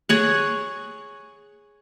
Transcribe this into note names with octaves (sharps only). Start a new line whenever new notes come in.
G#4 C#5 F#5